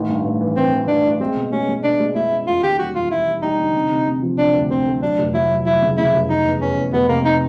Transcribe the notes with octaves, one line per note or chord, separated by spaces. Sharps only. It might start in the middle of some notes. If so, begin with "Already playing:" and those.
Already playing: A1 D#3
G2
A1
E3
E3 C4
E3
A1 D4
A1
G#3 C4
B2
G#3 C#4
G#3
B2 D4
G#3
G#3 E4
C#4
E1 F4
D#2 G4
G3 F#4
E1 F4
G3 E4
G3
G3 D#4
D3
C3
C3
C3
F3
C3 D4
D2
D2 C4
A3
F#3 D4
F1
F#3 E4
F#3
F#3 E4
C#3
C#3 E4
F1
F1 D#4
E2
E2 C#4
E2
F1 B3
C3 A#3
D#4